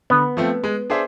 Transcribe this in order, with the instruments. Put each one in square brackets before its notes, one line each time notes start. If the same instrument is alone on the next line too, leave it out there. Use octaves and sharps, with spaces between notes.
[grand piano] D3 [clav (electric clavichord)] B3
[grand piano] F3 A3 C4
G#3
D4 G#4 C5 E5